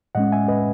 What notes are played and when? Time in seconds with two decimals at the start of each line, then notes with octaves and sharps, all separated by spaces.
0.15 A2 G#3 C#4 D#5 F#5
0.32 E5 G#5
0.48 B4 D#5